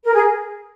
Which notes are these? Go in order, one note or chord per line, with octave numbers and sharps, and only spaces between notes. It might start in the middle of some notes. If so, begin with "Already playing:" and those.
A#4
G#4